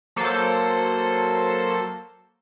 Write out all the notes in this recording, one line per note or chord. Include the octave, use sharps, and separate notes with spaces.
F#3 A#3 A4 C5